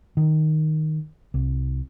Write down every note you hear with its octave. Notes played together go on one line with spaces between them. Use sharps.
D#3
C2